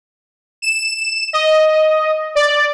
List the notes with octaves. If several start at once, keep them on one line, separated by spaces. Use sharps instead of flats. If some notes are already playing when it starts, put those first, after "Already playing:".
E7
D#5
D5